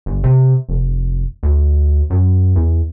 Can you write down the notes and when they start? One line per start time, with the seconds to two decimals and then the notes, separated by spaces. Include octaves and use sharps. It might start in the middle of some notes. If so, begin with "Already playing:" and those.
0.06 G1
0.24 C3
0.69 F1
1.43 D2
2.10 F#2
2.56 E2